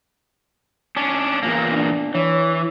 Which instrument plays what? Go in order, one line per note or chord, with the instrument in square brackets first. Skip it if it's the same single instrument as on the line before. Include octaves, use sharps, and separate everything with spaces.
[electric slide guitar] C#4 D4
E2 A#2 A#3
[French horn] D4
[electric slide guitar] E3 [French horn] C#5